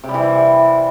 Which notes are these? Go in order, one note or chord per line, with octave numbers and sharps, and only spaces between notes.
C3
G3
E3